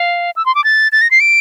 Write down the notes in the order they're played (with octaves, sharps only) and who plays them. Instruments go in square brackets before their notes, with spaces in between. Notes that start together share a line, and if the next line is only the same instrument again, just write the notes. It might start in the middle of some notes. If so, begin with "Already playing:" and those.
Already playing: [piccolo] F5
E6
C6
D6
A6
A6
A#6
C7
D7